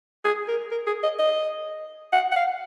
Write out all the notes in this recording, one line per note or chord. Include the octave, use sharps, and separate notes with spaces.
G#4
A#4
A#4
G#4
D#5
D#5
F#5
F#5
F5